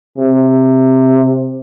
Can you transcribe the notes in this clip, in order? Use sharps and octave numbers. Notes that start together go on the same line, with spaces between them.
C3